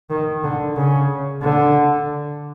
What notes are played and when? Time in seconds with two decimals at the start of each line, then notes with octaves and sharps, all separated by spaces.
0.10 D#3
0.44 D3
0.77 C#3
1.43 D3